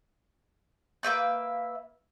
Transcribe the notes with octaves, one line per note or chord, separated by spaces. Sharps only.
A#3 B4 E5 G6